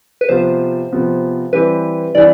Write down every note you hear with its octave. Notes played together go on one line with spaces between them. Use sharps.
B4
C3 F3 B3 F4 C5
C3 F3 B3 F4
E3 G3 C4 E4 G4 B4
E3 G3 C4 E4 D5